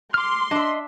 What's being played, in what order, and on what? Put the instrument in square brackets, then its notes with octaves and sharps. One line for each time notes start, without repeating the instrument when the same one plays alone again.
[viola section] C6 [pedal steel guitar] D6 F6
[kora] D4 E5 [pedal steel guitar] D#5